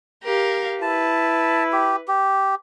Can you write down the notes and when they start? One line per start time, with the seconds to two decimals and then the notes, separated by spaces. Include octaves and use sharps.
0.23 G4 A#4 F5
0.82 E4 B4 A5
1.72 G4
2.08 G4